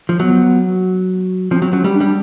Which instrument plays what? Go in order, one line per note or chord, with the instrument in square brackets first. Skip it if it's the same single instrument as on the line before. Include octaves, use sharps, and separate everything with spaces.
[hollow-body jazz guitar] F3
[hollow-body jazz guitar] F#3 [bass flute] B3
[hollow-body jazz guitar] F3 [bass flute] C4
[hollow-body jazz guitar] F#3 [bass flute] C4
[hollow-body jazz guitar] F#3 [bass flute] C#4
[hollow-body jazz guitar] G3 [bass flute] G#3
[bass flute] D4
[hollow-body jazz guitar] G3
[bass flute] D4